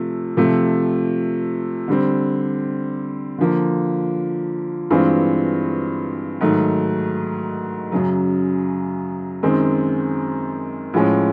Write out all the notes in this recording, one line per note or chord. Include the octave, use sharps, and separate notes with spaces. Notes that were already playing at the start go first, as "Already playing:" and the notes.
Already playing: C3 F3 A3
C3 F3 A3
D3 G3 C4
D3 F3 A#3
G2 E3 G#3 C4 F4
G#2 D#3 F#3 A3
F#2 C#3 F#3
F#2 D#3 G#3 C4
A2 F3 G#3 C#4